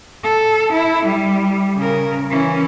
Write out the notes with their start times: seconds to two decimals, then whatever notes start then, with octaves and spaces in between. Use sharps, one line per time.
0.24 A4
0.73 E4
1.06 G3
1.78 C#3 A#4
2.30 E3 C#4